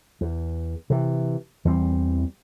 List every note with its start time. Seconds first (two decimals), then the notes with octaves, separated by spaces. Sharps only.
0.21 E2
0.90 C3 E3
1.65 E2 E3 G3 C4